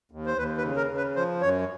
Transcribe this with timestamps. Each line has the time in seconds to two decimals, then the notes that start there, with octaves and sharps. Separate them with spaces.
0.11 D#2
0.26 C5
0.38 D#2 B4
0.57 B4
0.63 C#3
0.77 A#4
0.90 C#3
0.97 B4
1.16 F3 C5
1.42 F#2 C#5